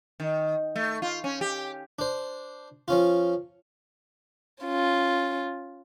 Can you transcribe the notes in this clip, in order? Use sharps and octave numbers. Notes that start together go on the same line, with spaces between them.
D#3
A3
F4
C#4
G4
D4 C5
F3 C#4 F4
C#4 F4